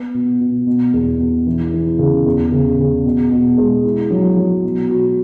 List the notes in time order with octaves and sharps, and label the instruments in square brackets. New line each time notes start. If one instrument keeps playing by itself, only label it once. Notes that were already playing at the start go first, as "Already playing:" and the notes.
Already playing: [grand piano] B3
B2
B2
B2
E2
B2
E3
E3
C#3
E2
C#3
C#3
B2
B2
G#3
E4
F#3
F#3
B2
F#4